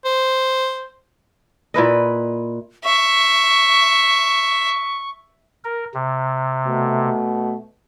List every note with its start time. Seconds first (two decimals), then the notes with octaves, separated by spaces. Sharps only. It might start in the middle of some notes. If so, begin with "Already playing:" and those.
0.05 C5
1.74 A#2 E4 B4 D#5
2.85 E5 C#6
5.64 A#4
5.94 C3
6.67 B2 A3